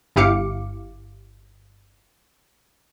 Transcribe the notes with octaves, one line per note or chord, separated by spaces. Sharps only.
G1 E4 G4 F5 D6 C#7